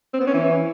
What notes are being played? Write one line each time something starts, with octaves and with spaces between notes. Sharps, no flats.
C4
B3
C#4
E3